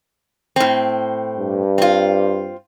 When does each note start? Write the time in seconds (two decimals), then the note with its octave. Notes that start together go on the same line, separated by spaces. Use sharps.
0.56 A2 C4
1.37 G2
1.78 C4 F4